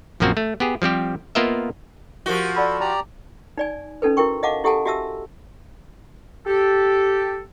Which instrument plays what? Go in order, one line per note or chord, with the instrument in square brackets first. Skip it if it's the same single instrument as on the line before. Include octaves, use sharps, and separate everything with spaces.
[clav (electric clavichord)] A#1 F#2 F3 A#3 C4 F#4
A3
B3 G4 G#4
F3 G3 C4 G4
A#3 B3 F4 A#4 D#5 E5
[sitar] F3 F#4 [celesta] G4 A#4 G7
[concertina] A4 [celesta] D5 F#5 B5
[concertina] G4 D5 A#5 [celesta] A5
[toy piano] D#4 D5 G#5
C#4 D#4 A4 B4
E4 F#4 A#4 G5 C#6
D#5 F5 F#5 A5 D6
E4 G4 A4 F#5 G#5 A5
F#4 G4 E5 A5 E6
[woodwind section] G4 A4